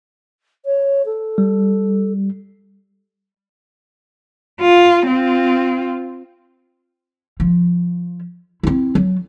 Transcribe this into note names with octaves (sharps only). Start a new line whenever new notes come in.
C#5
A4
G3
F4
C4 F4
F3
C4 E4
F#3